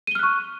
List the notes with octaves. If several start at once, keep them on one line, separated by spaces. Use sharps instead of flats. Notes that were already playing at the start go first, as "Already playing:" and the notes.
C#6 F6 F#6 D#7 G7